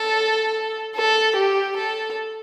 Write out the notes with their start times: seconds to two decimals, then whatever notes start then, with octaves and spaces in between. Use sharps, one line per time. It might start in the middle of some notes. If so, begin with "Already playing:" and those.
Already playing: A4
0.96 A4
1.36 G4
1.77 A4